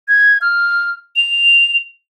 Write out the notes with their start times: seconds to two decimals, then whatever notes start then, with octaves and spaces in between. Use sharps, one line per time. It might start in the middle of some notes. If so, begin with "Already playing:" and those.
0.08 G#6
0.41 F6
1.16 F7